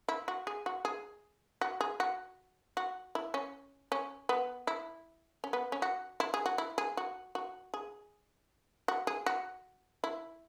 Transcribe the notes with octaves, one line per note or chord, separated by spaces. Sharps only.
E4
F#4
G#4
F#4
G#4
F#4
G#4
F#4
F#4
E4
C#4
C#4
B3
E4
C#4
B3
C#4
F#4
E4
G#4
F#4
E4
G#4
F#4
F#4
G#4
F#4
G#4
F#4
E4